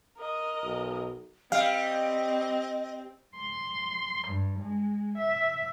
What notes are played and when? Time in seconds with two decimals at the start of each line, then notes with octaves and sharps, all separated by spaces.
0.17 A#4 D#5
0.63 B1
1.52 G3 C4 D#5 F5
3.35 C6
4.28 G2
4.59 G#3
5.18 E5